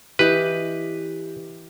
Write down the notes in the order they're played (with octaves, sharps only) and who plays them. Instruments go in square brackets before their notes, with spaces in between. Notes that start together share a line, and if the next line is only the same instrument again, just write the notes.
[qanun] E3 D#5 D6 [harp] G4 [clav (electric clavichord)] B4